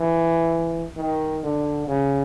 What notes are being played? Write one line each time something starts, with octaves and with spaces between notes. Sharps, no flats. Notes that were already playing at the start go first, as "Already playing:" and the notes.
Already playing: E3
D#3
D3
C#3